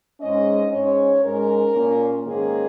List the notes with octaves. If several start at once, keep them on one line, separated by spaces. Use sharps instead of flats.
G#2 G#3 C#4 D#5
G#2 G#3 C#4 C#5
G#2 G#3 C#4 A#4
A#2 A#3 C#4
G#2 D#3 A#3 C#4 G#4